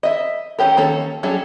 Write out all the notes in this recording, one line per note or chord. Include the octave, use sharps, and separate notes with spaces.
D#5 E5
E3 F#3 C#4 G4 A#4
D#3 A#3 C#4 A4
F#3 G3 C#4 G#4 A4